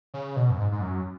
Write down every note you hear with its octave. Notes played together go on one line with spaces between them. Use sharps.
C#3
B2
F#2
G#2
G#2
F#2